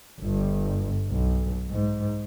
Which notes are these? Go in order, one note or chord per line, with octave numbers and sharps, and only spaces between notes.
G1 G2
B1
G#2